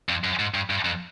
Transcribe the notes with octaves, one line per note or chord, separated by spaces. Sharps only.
F2
F#2
G#2
G2
G2
F2